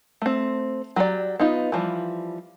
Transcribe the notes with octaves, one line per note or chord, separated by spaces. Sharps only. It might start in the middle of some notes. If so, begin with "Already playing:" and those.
A3 C4
F#3 G4 D5
B3 D#4 F4
E3 F3 G3